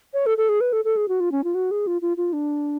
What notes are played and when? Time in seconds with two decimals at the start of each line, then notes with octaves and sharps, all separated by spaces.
0.14 C#5
0.26 A4
0.37 A4
0.49 G#4
0.61 B4
0.73 A4
0.85 A4
0.96 G#4
1.08 F#4
1.20 F4
1.32 C#4
1.44 F4
1.54 F#4
1.71 G#4
1.87 F4
2.02 F4
2.17 F4
2.33 D4